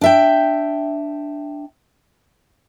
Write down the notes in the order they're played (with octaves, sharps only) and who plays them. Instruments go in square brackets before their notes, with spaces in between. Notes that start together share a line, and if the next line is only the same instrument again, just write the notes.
[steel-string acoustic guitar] D4 E5 G5